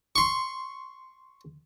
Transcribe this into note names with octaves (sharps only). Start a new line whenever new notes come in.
C6 C#6